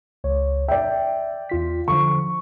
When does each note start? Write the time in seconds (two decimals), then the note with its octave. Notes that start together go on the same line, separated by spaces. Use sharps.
0.24 C#2 C#5
0.68 D5 E5 G5
1.50 E2 F4 B6
1.88 D3 F3 C#6